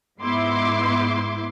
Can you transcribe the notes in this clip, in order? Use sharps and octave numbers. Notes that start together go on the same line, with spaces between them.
G#2 B3 E4 C6 D6